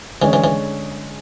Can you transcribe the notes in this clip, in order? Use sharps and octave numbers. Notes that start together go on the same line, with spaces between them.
D3 E3 G#3 C#4
E3
E3